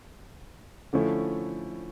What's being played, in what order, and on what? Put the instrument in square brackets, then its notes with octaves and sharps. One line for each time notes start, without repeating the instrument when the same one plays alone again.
[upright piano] D3 F3 A3 C#4 E4